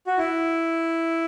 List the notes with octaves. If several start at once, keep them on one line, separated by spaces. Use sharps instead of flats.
F#4
E4